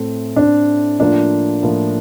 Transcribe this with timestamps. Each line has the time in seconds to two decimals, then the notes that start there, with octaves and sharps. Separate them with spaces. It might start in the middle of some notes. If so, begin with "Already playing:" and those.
Already playing: A2 A3 C4
0.36 A2 A3 C4 D4
1.00 A2 F3 A#3 D4 F4 A#4
1.63 A2 F3 A#3 F4 A#4